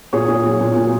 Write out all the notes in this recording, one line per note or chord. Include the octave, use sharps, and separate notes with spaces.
A#2 G#4 C#5
A#2
F#3
A#2
A#2